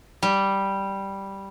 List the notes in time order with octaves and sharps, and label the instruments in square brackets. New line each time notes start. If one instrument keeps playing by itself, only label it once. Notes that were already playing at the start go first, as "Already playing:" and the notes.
[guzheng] G3